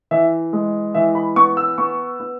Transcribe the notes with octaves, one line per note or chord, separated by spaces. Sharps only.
E3 E5
G#3
E3 E5
B5
B3 C#6
E6
B3 C#6
B3